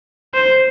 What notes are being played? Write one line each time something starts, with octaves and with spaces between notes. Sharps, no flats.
C5